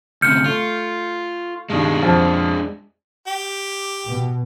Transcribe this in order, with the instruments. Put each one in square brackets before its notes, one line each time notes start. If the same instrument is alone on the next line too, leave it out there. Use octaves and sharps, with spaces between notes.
[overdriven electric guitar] D2 C3 [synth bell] F6 G6 C#7
[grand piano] A3 [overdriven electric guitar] F4
[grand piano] G2 B2 D#3 [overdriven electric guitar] G#3 D4
[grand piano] F2 F3
[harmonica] G4
[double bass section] B2